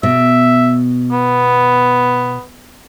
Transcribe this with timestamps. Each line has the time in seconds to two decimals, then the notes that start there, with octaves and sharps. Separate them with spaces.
0.03 B2 E5
1.12 B3